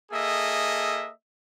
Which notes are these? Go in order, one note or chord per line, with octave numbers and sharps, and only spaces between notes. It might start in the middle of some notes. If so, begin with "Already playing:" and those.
A#3 G#4 A4 D#5 E5